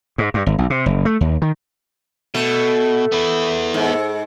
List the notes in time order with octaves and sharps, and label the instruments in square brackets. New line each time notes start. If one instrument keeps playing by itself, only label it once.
[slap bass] G#2
G2
G#1
B1
C3
F#1
A3
D#2
D#3
[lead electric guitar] B2 [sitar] A3
[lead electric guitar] B3 E4
[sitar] G#2